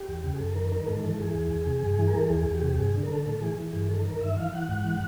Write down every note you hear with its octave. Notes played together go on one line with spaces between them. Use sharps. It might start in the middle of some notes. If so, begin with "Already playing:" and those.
Already playing: G4
E2
C#3
G#4
F#2 A4
D#3 A#4
D#3 A#4
G#2 A4
E3 A4
E3 G#4
E2
E2
C3
G2
E3
A#4
E3 A4
E2 G#4
E2
G4
C3 G#4
G4
G2 G#4
D3
A#4
D3 A4
A2 A4
E3 G#4
E3
G2 G#4
D#3 A4
D#3 A#4
G2 E5
E3 F5
E3 F#5
G#2 F#5
E3